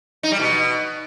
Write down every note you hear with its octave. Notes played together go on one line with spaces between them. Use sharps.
D#4
G3
B2